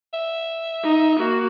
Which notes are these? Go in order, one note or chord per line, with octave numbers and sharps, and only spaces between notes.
E5
D#4
A#3 F#4